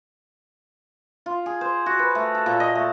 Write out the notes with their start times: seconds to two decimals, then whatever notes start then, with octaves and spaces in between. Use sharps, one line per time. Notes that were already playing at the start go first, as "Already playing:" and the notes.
1.26 F4
1.46 G#4
1.61 C5
1.86 F#4
1.99 B4
2.15 A3
2.35 A4
2.46 A#2
2.60 D#5
2.75 A3